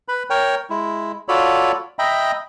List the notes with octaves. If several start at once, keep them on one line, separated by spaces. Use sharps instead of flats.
B4 B5
A#4 C#5 G5
G#3 E4
F4 F#4 A4 C#5 D5 B5
D#5 E5 G5 A#5 B5